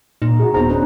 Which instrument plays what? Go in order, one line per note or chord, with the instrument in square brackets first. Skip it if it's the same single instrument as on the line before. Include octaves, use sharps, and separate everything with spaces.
[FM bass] A#2 [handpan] D#4
[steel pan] F#4 G#4
[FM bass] D#1 [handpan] B3 D#4 C5 [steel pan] A#5
[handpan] C#4 D4 B4